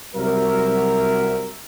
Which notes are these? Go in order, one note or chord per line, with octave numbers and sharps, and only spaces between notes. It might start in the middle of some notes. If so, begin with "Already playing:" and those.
C2 F#3 A#4 E5